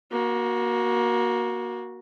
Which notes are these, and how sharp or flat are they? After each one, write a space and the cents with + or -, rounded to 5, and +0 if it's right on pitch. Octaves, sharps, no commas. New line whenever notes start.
A#3 +25 F#4 +0